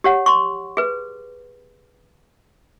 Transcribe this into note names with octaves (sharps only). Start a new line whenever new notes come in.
G4 C#5 F#5
C6 C#6
G#4 B4